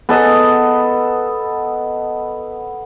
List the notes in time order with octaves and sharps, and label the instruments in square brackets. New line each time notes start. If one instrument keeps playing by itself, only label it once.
[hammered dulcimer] B3 A4 D#5